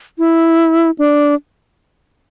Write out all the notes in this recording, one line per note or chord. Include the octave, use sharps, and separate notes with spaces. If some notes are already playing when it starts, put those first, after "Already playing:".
E4
D4